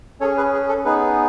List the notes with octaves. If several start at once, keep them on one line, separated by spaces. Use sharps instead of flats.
C#4 G#4 A4 C#5
G#4 B4
G#4
A4
B3 D#4 G#4 B4